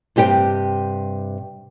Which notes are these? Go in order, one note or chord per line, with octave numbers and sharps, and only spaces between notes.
G2 C3 G4 B4 G5